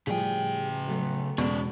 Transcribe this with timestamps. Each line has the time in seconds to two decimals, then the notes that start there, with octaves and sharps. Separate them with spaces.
0.07 A2 C#3 F3 G3 G#4 G5
0.87 F#3 A3 B3
1.38 E2 B2 G#3 C#4 D5